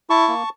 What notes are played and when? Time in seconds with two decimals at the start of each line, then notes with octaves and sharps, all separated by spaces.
0.10 E4 A5 C#6
0.28 A#3